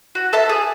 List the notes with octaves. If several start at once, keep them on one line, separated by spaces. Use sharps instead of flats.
F#4
A4 E5 A5
G#4